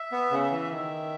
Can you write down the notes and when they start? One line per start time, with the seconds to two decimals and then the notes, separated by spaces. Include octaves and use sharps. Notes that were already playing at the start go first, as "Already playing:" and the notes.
Already playing: E5
0.12 B3
0.31 C#3
0.51 E3
0.71 D#3 E5